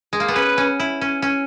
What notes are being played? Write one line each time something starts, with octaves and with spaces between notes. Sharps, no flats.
G#3
A#3
B3
C#4 B4
C#4
E4
C#4
C#4